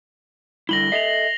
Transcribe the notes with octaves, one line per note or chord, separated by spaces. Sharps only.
D3 G3 E4 A#6 F#7 G7
A4 D#5 E5 C7 F7